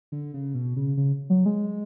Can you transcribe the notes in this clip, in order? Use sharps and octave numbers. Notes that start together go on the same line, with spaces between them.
D3
C#3
B2
C#3
C#3
F#3
G#3